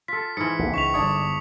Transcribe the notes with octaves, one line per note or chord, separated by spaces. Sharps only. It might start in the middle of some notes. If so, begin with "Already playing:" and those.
F4 A4 B6
G#2 E3 C#7
A#1 E2
C#2 C#6 B6 F7
G1 D4 C#5 D#6